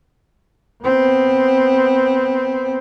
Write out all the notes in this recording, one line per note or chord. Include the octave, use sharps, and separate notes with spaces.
B3 C4